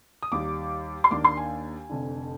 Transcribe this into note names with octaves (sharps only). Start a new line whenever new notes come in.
D#6
D#2 D#3 G3 D6
C6
D#2 D#3 A#3 D4 D6
C6
G#5
F1 F2 D3